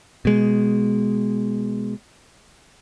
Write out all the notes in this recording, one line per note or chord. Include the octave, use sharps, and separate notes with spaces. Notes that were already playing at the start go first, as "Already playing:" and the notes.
B2 G#3